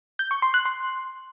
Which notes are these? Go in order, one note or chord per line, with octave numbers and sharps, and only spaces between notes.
G6
C#6
C6
F#6
C6